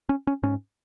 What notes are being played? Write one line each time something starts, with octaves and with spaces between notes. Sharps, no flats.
C#4
C#4
G#2 C#4